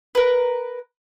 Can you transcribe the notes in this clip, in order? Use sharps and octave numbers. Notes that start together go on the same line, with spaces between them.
A#4 B4